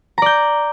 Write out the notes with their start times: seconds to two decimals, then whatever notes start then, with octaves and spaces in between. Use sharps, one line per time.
0.18 A#5
0.22 D5
0.26 G6